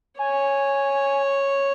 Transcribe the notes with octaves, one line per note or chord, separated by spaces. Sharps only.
C#5 G#5